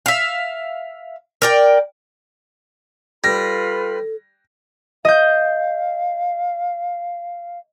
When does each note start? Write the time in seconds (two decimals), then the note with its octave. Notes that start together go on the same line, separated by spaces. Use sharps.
0.06 E5 F5
1.42 A#4 D5 G5
3.24 G3 F4 A4 B4 B5 A#6
5.05 D#5 F5 G6